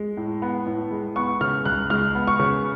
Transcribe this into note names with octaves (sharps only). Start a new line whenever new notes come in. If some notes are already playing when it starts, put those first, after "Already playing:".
Already playing: G#3
A2
B3
A2
G#3
B3 C#6
C#3 F6
C#2 F#6
G#3 F6
B3
C#6
C#3